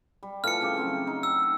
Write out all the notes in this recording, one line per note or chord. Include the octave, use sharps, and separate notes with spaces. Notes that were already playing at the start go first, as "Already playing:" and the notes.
G3
E3 F3 A3 F6 C#7
C#3 G5 D6
C#3 F#3 C4
D#4
E6